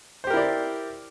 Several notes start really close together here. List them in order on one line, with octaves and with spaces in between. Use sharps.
C5 G4 A#4 E4 D5